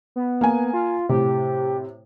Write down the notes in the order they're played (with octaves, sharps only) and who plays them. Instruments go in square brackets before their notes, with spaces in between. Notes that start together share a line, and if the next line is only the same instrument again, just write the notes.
[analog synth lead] B3
[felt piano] A#3 G#5
[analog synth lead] F4
[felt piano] A2 C3 [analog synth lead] G4